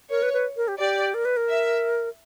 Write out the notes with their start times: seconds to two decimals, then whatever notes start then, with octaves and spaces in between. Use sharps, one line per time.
0.10 A#4 C#5
0.23 B4
0.33 B4
0.57 A#4
0.68 G4
0.79 G4 D5
1.14 A#4
1.25 B4
1.37 A#4
1.49 E5